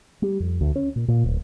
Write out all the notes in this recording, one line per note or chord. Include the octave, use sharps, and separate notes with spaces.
G3
F2
D2
C#4
A#2
A#2
D1